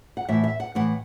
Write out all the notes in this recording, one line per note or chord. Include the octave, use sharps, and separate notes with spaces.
F#5
A2 E3 E5
E5
F#5
A2 E3 F#5